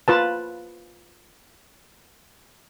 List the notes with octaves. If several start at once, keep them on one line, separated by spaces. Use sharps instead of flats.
F4 B4 A5